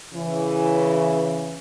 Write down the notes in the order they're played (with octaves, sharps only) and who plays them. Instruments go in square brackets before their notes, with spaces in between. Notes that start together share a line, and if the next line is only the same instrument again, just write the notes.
[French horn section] C#3 E3